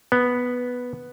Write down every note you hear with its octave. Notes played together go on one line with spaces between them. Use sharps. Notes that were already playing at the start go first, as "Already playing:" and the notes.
B3